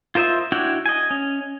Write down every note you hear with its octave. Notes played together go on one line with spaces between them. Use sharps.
F4 A#4 C5 D#5 E5
D4 E4 F#4 C#5 G5
D#5 G#5
C#4